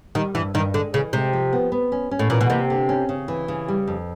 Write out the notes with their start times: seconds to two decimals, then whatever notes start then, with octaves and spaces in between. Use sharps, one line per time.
0.15 D#3 G3
0.35 G2 E3
0.54 G2 D#3
0.74 D3 G#3
0.94 C#3 E3
1.13 C3 G#3
1.33 F3
1.53 B3
1.72 B3
1.92 C#4
2.11 C#4
2.19 A2
2.30 A#2 E3
2.41 B2
2.50 C3 A#3
2.70 D3
2.89 C#4
3.09 C#3
3.28 E3
3.48 C#3
3.68 G3
3.87 F2